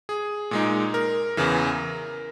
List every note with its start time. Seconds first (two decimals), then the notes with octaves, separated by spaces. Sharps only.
0.09 G#4
0.51 A#2 G#3 D#4
0.94 A#4
1.37 E2 C#3 E3